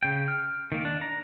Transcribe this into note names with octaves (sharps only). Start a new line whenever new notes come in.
C#3 G5
F6
D#3 A#3
D4
A#5